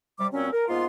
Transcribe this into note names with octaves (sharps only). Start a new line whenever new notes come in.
C3 G3 D6
A#2 F#3 C4 C#4
A#4
G#2 A#3 B3 F4 C6